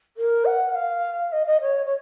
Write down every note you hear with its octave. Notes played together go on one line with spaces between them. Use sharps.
A#4
F#5
F5
D#5
D#5
C#5
C#5